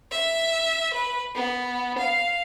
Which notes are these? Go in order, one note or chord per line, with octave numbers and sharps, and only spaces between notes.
E5
B4
B3
F5